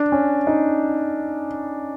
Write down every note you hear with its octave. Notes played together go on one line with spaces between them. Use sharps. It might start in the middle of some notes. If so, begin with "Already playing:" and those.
Already playing: D4
C#4
D#4